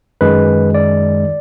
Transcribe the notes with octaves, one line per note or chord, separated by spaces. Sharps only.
F#2 D#3 G#3 B4
D5